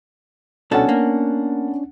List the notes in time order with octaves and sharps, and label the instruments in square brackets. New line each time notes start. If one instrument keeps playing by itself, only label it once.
[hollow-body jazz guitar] C2 B2 A4 [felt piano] B3 F#5 A5 [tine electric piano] C#4 D4
[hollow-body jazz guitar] A#3